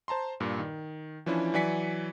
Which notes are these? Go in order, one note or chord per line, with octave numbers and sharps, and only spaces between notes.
C5 A5 A#5 C6
G2 A#2
D#3
E3 F3 C#4 D4 E4
E3 F#3 D5 G#5 B6 C#7